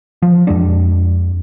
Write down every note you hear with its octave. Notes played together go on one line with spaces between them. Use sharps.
F3
F2 G#3 D4